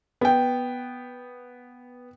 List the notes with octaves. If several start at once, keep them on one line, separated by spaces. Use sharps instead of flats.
B3 G5